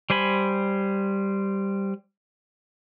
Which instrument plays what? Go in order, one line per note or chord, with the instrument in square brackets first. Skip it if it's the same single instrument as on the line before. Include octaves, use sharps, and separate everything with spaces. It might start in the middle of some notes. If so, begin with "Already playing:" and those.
[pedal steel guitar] G3 C5 G#5 B5